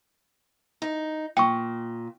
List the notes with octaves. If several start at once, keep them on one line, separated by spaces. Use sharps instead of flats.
D#4
A#2 G5 C#6